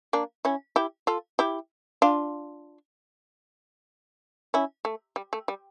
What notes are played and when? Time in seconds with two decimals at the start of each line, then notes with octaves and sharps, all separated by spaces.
0.13 A#3 D4
0.45 C#4 E4
0.76 E4 G4
1.07 F4 A4
1.39 E4 G4
2.02 D4 F4
4.54 C#4 E4
4.85 A3
5.16 G3
5.33 A3
5.48 G3